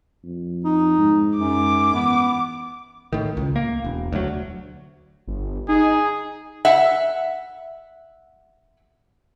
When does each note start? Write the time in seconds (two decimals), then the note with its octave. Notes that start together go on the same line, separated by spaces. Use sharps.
0.25 F2
0.64 D#4
0.98 G#2
1.37 F#2 D6
1.94 E3 B3
3.13 A2 D#3
3.37 C#2
3.56 A#3
3.84 E1
4.12 D2 F#3
5.27 G1
5.69 D#4 G#4
6.65 E5 F#5